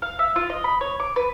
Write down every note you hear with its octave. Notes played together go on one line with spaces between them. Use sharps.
F5
E5
F4
D#5
B5
C#5
D6
B4